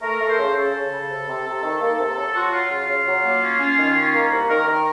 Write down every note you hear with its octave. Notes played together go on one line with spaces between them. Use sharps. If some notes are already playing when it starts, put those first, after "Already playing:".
A3 A#4
A3
C5
C#3
C#3 A4
C#3
C#3
C3
C3
C3
D#3
A#3
C3
F#3 A4
F4 F#4
F#3 F4
C#3 F4
C#3
F#3
A#3
C#4
C#4
D#3
C#4
A#3
C2 F#4
D#3 A#4
D#3 A#4